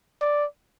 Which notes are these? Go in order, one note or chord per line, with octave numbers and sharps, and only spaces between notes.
D5